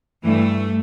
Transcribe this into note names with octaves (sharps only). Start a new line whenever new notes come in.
G2 E3 A3